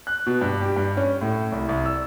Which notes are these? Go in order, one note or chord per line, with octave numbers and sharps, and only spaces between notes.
F#6
B2
G2
G4
G2
C#4
A2
C2
C2
E6